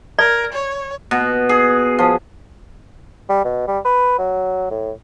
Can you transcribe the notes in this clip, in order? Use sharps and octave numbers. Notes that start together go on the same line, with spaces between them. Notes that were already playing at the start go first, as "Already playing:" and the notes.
A#4 D5
C#5
B2
G#4
F3
G3
B2
G3
B4
F#3
A2